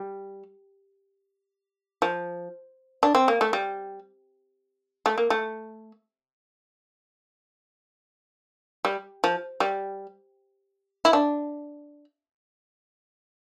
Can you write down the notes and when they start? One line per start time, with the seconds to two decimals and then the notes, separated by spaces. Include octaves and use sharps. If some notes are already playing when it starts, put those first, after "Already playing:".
Already playing: G3
2.02 F3
3.03 D4
3.15 C4
3.28 A#3
3.41 A3
3.53 G3
5.06 A3
5.18 A#3
5.30 A3
8.85 G3
9.24 F3
9.60 G3
11.05 E4
11.13 D4